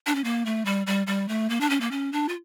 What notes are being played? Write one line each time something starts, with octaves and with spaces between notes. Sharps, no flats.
D4
C#4
A#3
A3
G3
G3
G3
A3
A#3
D4
C#4
A#3
C#4
D4
F4